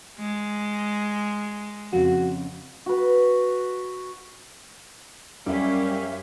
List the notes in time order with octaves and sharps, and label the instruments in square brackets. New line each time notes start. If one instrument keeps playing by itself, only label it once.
[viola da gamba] G#3
[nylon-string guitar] F2 C#3 [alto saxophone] F#4
[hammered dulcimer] F#4 B4
[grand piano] F#2 [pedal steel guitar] G3 [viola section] C#4 G4 [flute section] A#4 E5 F5